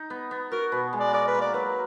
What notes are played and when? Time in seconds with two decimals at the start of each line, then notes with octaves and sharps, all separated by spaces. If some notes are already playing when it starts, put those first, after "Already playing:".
Already playing: D#4
0.10 B3
0.31 B3
0.52 F#4 A#4
0.72 B2 B4
0.93 G#3
1.00 D5
1.13 A#4 D5
1.28 B4
1.35 A#3
1.41 D5
1.54 F#3 B4